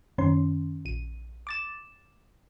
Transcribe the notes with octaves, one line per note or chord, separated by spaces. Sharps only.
F#2 D#3 C#4 C5 C6
A#1 D#7
D6 A6 E7